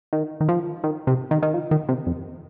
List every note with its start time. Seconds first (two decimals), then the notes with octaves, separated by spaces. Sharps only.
0.13 D#3
0.41 D#3
0.49 F3
0.84 D#3
1.07 C3
1.31 D#3
1.42 D#3
1.54 F3
1.71 D#3
1.89 C3
2.07 F2